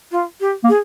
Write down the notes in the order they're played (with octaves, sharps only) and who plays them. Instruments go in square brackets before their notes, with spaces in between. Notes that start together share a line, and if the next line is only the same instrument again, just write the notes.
[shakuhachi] F4
G4
[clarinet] A#3
[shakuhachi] G#4